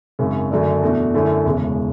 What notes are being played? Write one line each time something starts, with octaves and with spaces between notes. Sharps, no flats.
G#1 F#2 C#3
F#2 D3 F#3 A3 D4
E2 B2 A3 D4 F#4
F#2 D3 A3 E4
E1 E2 C#3 G#3